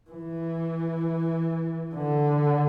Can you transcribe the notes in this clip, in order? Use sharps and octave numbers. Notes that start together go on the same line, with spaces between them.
E3
D3